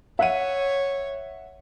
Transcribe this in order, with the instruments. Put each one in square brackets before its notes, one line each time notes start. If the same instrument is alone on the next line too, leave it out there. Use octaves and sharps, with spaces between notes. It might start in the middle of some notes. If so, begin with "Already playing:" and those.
[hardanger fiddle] C#5 [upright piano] E5 F#5 D#7